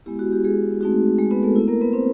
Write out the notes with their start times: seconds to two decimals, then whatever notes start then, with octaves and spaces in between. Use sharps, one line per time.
0.06 G#3 B3 E4 G4
0.19 F#4
0.32 G4
0.44 G#3 G#4
0.81 A3 C4 D#4 F#4
1.18 G#3 G#4
1.31 B3 B4
1.43 A3 A4
1.56 B3 E4
1.68 A#3 A#4
1.81 B3 B4
1.93 C4 C5